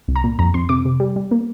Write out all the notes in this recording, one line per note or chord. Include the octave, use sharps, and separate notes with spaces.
C2
A#5
A#2
F2 A#5
F2 C6
C3 D6
C3
G3
G3
A#3